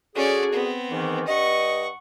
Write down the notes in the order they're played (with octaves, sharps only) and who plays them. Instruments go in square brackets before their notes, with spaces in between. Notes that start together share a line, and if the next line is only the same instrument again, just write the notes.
[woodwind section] D3 F#4 G#4 [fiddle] C#4 D5
[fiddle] B3 C4
[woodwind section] G#2 D#3 E3
[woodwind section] G2 D#5 [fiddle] F#5 C#6